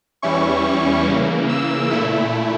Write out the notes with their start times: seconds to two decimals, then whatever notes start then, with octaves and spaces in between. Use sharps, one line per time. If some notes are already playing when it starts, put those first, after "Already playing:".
0.22 E2 E3 G3 C#4 E4 C#6
0.64 C#6
1.07 C#3 E3 A#3
1.49 E6
1.91 A#2 A3 E4